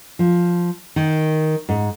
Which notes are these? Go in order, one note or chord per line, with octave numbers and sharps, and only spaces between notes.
F3
D#3
G#2